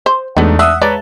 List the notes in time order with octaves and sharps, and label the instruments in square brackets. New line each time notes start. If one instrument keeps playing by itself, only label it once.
[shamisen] C5
[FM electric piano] E2 G#3 [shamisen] F#3 B3 [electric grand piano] A3 D4 D#4
[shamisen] D4 [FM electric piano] E5 F#5 [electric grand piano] D#6 E6 F#6
[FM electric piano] G#3 A5 [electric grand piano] B4 C#5 A#5 [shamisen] D5